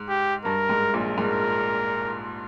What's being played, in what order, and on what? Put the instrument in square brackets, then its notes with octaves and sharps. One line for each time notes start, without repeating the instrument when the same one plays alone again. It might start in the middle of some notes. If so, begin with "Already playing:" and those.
Already playing: [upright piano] G#2
[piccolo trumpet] G4
[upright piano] G2 [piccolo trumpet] A#4
[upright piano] G#2
A#1 A#2
[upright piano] G#2 [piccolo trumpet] A#4